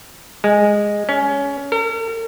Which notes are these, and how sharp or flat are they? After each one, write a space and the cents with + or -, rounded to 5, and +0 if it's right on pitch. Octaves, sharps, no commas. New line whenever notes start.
G#3 -10
C#4 +20
A#4 -45